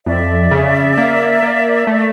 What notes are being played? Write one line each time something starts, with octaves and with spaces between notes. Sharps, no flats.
F2 D5 E5
C#3
A#3
A#3
A3